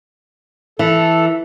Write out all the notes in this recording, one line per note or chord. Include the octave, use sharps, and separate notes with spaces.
E3 A4